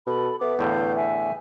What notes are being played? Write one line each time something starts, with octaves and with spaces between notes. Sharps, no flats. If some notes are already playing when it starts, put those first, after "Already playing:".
B2 A4 B5
B3 A4 E5 D6
E2 A2 D3 F5 G6
E5 G#5